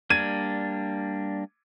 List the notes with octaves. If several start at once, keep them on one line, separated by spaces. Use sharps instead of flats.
G3 A#3 D4 G#6 D#7